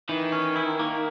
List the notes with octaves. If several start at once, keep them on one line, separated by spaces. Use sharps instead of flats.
D#3 E3
C#4
E4
A#3